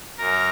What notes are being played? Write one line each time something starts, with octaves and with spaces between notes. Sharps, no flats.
F#2 A#4 A#5